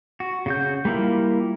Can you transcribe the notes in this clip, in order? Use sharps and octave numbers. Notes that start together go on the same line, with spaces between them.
F#4
C#3 F#4 G6
G3 A#3 E4 F4